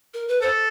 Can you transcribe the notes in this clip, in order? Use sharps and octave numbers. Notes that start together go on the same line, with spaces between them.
A#4
B4
A4 C5